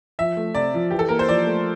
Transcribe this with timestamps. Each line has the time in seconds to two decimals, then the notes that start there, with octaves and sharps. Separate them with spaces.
0.19 F3 E5
0.37 A3
0.55 C3 D5
0.74 F3
0.90 E3 G4
0.99 A4
1.09 A#3 A#4
1.19 C5
1.29 F3 D5
1.47 A3